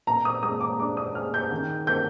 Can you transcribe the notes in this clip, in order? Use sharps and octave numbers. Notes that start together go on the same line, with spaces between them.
A#2 A#5
D#6
G#3 D#6
D6
D4 D6
D#6
G#4 F6
G6
D#3
A#3 G6